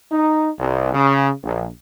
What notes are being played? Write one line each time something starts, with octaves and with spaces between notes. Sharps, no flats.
D#4
C2
C#3
A#1